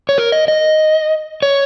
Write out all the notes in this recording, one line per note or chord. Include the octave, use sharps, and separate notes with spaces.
C#5
A#4
D#5
D#5
C#5